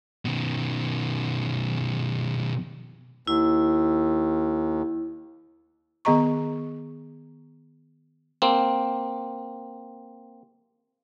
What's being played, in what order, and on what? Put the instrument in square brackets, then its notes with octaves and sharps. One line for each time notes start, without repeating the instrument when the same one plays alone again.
[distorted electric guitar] B2 D#3
[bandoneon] D#2 [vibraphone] E4
[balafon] D#3 B3 G#4 D#5 A#5 C#6
[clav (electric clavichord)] A#3 C4